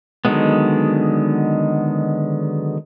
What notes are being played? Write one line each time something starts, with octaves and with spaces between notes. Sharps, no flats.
D3 D#3 F#3 G#3 B3